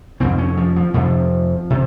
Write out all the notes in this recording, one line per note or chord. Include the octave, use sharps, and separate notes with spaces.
F2 C3 C4
C#4
F3
F3
F2 C3 F3
C3